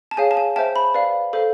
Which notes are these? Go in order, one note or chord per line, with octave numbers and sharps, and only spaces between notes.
A5
G#4 C#5 F5 G#5
A5
G#5
C5 E5 G5 A5
B5
B4 D5 F5
A4 C5 F5